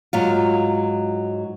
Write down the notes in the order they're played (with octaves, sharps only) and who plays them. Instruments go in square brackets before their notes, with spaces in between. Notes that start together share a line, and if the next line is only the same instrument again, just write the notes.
[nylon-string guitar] G#2 F#3 F4